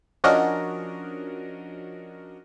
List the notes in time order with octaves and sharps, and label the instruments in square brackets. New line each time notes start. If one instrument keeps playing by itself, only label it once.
[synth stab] F3 C#4 D4 F#4 A#4 D#5